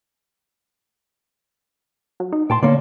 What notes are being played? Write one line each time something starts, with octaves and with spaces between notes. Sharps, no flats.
F#3
D#4
A#2 G5 A5 C6
D3 A#3 C#5 D5